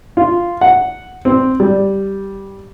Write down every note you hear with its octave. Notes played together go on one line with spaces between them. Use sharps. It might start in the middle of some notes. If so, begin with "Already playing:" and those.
F4
F#5
C4
G3